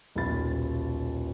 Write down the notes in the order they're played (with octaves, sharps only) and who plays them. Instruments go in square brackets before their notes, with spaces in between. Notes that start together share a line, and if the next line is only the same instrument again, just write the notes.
[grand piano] D#1 B1 B5 A6